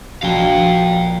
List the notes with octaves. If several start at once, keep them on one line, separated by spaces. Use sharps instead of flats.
A#1 F#4 F5 G5